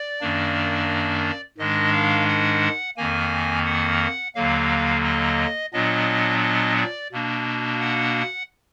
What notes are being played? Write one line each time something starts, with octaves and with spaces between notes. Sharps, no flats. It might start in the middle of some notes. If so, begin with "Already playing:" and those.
Already playing: D5
F#2 D#3 A#3 D4
G#2 D#3 G#3 D4 D#5
F5
F#5
F2 D#3 A#3 G#5
F#5
D#2 D3 F#3 A#3 F5
D#5
A#2 F#3 B3 D4 D#5
D#5
D5
B2 A#3 D4
F#5